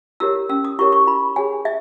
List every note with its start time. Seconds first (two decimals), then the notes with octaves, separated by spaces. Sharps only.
0.20 E4 G4 A#4 C#5 E6
0.49 C#4 E6
0.65 D#6
0.79 E4 G4 A#4 C#5 C#6
0.92 C#6
1.07 E4 B5
1.36 G#4 C#5 G#5
1.65 E5